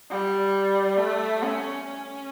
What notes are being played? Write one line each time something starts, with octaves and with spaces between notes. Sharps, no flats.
G3
A3
C#4
C#4